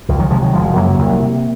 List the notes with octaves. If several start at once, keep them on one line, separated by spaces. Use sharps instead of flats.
C#2 F3
D#3 F#3
C3 F3 G#3
D#3 F#3
F#1 F3 G#3
F#2 C#3 F#3 A#3
C2
C3